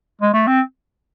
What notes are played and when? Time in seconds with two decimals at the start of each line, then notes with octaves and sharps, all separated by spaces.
0.22 G#3
0.34 A3
0.47 C4